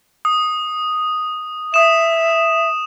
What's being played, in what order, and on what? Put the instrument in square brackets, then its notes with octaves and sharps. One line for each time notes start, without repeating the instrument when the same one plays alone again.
[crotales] D#6
[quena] E5 [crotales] D#6 E7